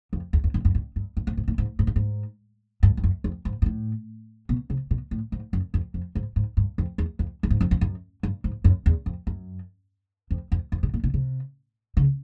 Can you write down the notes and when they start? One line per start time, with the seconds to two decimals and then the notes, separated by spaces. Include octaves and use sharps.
0.13 F2
0.33 E2
0.44 F2
0.54 F#2
0.65 F#2
0.75 G2
0.96 G2
1.17 G2
1.27 G#2
1.37 G#2
1.48 A2
1.58 G#2
1.79 G#2
1.87 G2
1.96 G#2
2.83 G2
2.97 G2
3.04 F#2
3.24 F2
3.45 G#2
3.62 G#2
3.66 A2
4.49 B2
4.70 C3
4.91 B2
5.11 A2
5.32 G#2
5.53 F#2
5.74 F2
5.94 F2
6.15 G#2
6.36 G#2
6.57 G2
6.78 F2
6.98 E2
7.19 F2
7.43 G2
7.50 G#2
7.61 F2
7.71 F2
7.81 F#2
8.23 G2
8.44 G#2
8.64 F#2
8.86 E2
9.06 F2
9.27 F#2
10.31 F2
10.52 F2
10.72 F2
10.83 B2
10.94 A#2
11.04 B2
11.14 C3
11.97 C#3